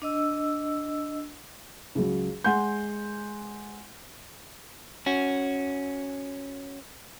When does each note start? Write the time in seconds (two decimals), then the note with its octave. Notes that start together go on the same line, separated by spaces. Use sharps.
0.02 D4 D#5 E6
1.95 C#2 F#3
2.44 G#3 F#5 G#5 C6 G6
5.06 C#4 F#4